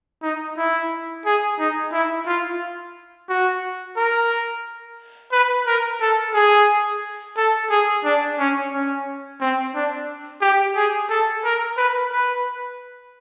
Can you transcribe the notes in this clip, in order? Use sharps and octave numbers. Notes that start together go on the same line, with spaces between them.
D#4
E4
G#4
D#4
E4
F4
F#4
A#4
B4
A#4
A4
G#4
A4
G#4
D4
C#4
C#4
C4
D4
G4
G#4
A4
A#4
B4
B4